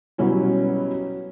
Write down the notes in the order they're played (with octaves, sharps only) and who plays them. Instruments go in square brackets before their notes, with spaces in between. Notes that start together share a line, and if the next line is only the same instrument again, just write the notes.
[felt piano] B2 F#3 G3 C#4 E4